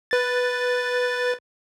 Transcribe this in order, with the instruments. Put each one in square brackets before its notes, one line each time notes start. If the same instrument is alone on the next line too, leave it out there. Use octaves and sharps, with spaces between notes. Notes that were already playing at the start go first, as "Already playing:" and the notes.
[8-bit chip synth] B4 A6